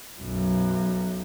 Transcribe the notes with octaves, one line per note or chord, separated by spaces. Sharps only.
B1 F#2